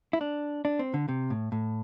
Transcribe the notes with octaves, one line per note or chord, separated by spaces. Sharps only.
E4
D4
D4
C4
D3
C3
A2
A2